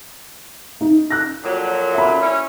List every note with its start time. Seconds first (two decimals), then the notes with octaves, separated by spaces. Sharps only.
0.81 D#4
1.10 F#6 A#6
1.43 F2 A#2 F#3
1.94 E5 B5
2.22 C#4 E4